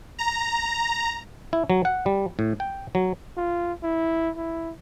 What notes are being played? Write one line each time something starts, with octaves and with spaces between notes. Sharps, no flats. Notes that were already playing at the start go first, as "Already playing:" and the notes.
A#5
E4
F#3
F#5
G3
A2
G5
F#3
F4
E4
E4